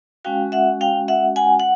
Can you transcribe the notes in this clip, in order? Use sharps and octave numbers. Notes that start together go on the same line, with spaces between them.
G#3 C#4 F#4 F5 G5
E5 F#5
F5 G5
E5 F#5
F#5 G#5
F#5